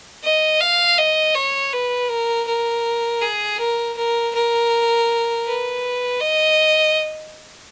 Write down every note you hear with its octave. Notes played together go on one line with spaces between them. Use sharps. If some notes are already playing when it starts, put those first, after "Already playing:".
D#5
F5
D#5
C#5
B4
A#4
A#4
G#4
A#4
A#4
A#4
B4
D#5